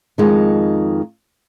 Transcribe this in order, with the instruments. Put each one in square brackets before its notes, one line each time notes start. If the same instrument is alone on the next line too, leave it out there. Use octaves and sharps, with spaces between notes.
[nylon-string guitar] F2 D#3 G#3 D#4